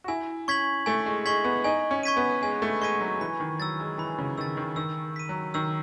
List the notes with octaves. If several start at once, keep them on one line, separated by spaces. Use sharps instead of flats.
F#4
E4 G#5
C#4 C#6 G#6 B6 F#7
A3 G#5
G#3
G#3 C#6 G#6 B6 F#7
B3
D#4 G#5
C#4
C#6 G#6 B6 D#7
B3
G#3 G#5
A3
G#3 C#6 G#6 B6 D#7
F#3
E3 B5
D#3
F#3 E6 A6
G#3
E3 B5
C#3
D#3 E6 A6
D#3
D#3 E6
B6 D#7
F#3
D#3 E6